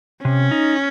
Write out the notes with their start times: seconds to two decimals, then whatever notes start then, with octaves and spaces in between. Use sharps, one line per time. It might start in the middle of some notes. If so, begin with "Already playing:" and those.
0.24 C3 C#4
0.51 D#4